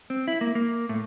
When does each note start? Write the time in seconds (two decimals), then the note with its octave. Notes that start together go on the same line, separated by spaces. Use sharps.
0.10 C4
0.28 E4
0.41 A#3
0.55 A#3
0.89 A2